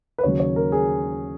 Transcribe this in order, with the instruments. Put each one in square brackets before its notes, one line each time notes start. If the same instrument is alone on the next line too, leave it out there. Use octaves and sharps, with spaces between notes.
[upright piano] B4
D#2 C#3 F#3 C#5
C#5
A#4
G#4